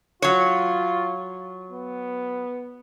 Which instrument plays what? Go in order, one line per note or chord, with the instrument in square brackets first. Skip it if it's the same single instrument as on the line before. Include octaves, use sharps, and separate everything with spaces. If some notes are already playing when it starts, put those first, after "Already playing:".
[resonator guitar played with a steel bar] F#3 C#5 [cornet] F4
[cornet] B3